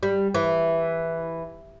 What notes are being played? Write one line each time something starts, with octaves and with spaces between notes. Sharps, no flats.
G3
E3